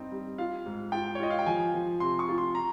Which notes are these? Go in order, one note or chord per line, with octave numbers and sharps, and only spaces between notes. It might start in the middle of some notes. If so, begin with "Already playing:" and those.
Already playing: G2 C4 D#4
G3
F4 F5
G#2
F4 G5
C#5
F4 D#5
F5
G5
F3 G#5
F3
C3 C6
C#6
F4
C6
A#5